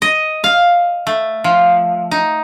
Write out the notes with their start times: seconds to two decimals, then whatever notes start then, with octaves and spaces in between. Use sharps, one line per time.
0.02 D#5
0.44 F5
1.07 A3
1.44 F3
2.11 D#4